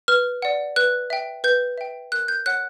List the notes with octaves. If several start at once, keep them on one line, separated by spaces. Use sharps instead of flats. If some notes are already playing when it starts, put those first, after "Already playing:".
B4 F6
D5 F#5
B4 F#6
E5 G5
B4 G6
E5 G5
A#4 F#6
G6
C#5 F#5 F#6